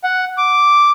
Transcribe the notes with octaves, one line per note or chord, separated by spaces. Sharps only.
F#5
D6